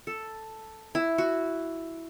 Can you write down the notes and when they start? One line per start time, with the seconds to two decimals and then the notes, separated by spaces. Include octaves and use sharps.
0.07 A4
0.95 E4
1.18 F#4